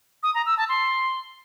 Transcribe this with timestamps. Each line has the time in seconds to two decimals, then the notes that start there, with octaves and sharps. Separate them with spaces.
0.23 D#6
0.35 A#5
0.46 E6
0.57 A5
0.69 C6